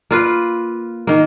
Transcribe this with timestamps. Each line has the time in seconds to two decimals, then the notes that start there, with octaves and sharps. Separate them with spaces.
0.11 A#3 F4 B4
1.07 D#3 A#3